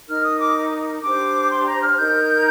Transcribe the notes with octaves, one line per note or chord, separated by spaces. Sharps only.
D#4 A#4 F6
D#6
D6
D4 G4 C5 D6
C6
A#5
F6
D#4 A#4 G6